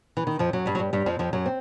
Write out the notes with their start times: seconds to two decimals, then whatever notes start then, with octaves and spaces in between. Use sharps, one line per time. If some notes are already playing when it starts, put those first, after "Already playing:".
0.17 E3
0.27 D#3
0.39 F2 F3
0.53 F#2 F#3
0.66 G2 G3
0.75 F#3
0.79 G2 G3
0.93 G2 G3
1.06 F2 F3
1.19 F2 F3
1.33 F#2 F#3
1.46 C4